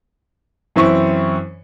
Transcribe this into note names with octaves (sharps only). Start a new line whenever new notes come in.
F#2 E3 C4 E4 C#6